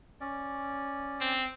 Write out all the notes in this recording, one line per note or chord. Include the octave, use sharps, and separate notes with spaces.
C#4 D5
C4